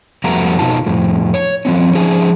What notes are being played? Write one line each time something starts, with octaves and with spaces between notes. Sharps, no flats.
F2 G3 A3 B3 F#4 A#5
B2 D#4 F4 A5
F2 A2
C#5
F3 C4 C#4
F3 C#4 G#4